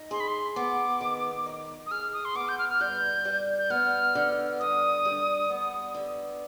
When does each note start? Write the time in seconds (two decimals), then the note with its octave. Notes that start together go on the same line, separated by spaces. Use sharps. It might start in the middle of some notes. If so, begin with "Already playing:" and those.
Already playing: D#4
0.11 G#4 C6
0.20 B5
0.28 C6
0.56 B3 D6
1.01 D#3
1.46 D#4
1.86 D#6
1.91 G#4 F6
2.13 D#6
2.25 C6
2.35 B3 D6
2.48 G6
2.59 F6
2.69 F6
2.81 G2 G6
3.25 G3
3.58 G6
3.70 B3 F6
4.15 D3
4.60 G2 D#6
5.05 G3
5.50 B3
5.94 D3